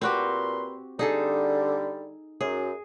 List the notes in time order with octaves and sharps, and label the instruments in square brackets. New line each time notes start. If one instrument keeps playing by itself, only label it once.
[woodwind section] A#2 B4 C6 [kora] C4 F#4 G4
[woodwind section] D3 G3 [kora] D#4 G#4 A4
[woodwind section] F#2 [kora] G#4